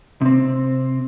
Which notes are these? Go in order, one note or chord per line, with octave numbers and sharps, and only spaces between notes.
C3 C4